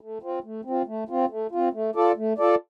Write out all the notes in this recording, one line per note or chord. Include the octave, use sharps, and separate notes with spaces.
A3
C4 F4
A3
C4
F4
A3
C4 F4
A3
C4 F4
A3
F4 A4 D5
A3
F4 A4 D5